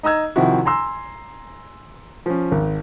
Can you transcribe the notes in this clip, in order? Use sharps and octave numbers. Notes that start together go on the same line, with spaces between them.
D#4 D#5 A#5 E6 G#6
C3 D#3 F3 E4 F#4
G#5 A#5 C6 E6
F3 C#4
G#1